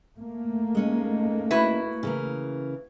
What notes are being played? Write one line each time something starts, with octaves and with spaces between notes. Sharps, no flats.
A3 A#3
G#3 C#4 D#4
E4 F#4 B4
C#3 E3 A#4